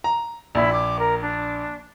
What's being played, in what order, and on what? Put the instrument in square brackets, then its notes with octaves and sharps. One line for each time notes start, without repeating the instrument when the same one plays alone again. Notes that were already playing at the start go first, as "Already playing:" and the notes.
[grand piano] A#5
[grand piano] A#1 [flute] E4
[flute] D6
A#4
D4